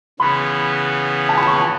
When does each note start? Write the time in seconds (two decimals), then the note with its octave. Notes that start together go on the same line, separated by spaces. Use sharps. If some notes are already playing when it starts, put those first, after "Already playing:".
0.20 C#3 E3 B3 B5
1.29 A5
1.37 B5
1.47 C#6
1.56 A5